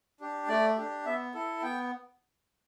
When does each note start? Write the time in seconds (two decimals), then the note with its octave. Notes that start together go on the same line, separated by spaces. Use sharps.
0.20 D4 G4
0.48 A3 D5
0.77 D4 G4
1.05 B3 E5
1.34 E4 A4
1.62 B3 G5